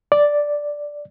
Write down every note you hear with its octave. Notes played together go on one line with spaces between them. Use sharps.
D5